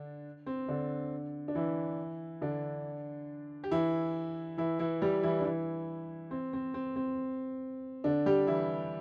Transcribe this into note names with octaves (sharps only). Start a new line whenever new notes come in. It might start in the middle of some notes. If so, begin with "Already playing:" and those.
Already playing: D3 D4
C4
D3 D4
D4
E3 E4
D3 D4
G4
E3 E4
E3 E4
E3 E4
G3 G4
E3 E4
D4
E3 E4
C4
C4
C4
C4
D3 D4
G3 G4
E3 E4